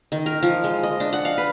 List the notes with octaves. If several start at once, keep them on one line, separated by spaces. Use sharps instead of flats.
D#3
A#4
F3
G#3
D#5
D4
F#5
F5
B4